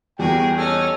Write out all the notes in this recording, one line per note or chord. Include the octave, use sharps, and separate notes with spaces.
E2 G3 F#4 G#4 A#4 G5
C#4 D#4 A4 F6